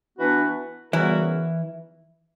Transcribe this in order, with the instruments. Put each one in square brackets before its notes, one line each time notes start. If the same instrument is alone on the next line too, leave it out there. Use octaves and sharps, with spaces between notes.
[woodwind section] E3 B3 D4 F#4 B4
[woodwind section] C#3 G3 B3 F#4 A#4 [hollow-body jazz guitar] E3 E4